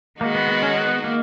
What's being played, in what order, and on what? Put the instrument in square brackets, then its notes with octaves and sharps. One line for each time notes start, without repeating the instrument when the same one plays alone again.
[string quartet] D#3 G#3 D#4 F#4 [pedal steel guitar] A#3
[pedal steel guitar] B3
B3
C#4
B3
A#3